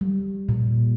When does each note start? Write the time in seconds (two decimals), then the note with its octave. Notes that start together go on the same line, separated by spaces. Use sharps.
0.01 G3
0.49 A#2